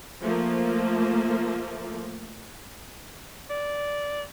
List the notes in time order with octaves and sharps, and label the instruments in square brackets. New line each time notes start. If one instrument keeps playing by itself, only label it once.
[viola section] F3 A3 A#3
[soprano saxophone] D5